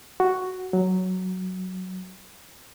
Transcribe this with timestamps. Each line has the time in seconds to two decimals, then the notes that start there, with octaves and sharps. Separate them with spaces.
0.20 F#4
0.73 F#3